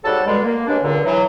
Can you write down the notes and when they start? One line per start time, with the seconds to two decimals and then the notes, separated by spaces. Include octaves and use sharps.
0.04 G#2 F#3 G3 A4 F#5 A5
0.26 G2 B2 D3 G3 G#3
0.44 A#3
0.68 G2 G#3 C#4 D4
0.83 C#2 G2 A#2 D3
1.04 E3 F#3